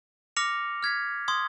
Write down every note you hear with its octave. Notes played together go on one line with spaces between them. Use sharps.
D6 F6 A#6 C#7 F7
F6 G#6 B6
C6 D#6 G#6